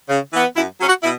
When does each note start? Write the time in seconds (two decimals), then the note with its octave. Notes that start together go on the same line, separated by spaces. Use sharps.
0.09 C#3
0.32 E3 B3
0.56 F#2 E4
0.80 F#3 C#4
0.88 F#4
1.03 B2 E4